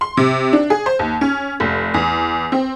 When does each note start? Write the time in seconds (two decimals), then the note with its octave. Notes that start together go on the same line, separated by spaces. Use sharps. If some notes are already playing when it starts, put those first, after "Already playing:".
0.01 C6
0.17 C3
0.53 D4
0.70 G#4
0.86 C5
0.99 D#2
1.21 C#4
1.60 F1
1.94 E2
2.52 C4